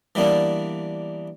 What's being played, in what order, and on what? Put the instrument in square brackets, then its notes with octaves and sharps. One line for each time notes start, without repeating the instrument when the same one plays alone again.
[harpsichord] E3 G3 A#3 B3 D4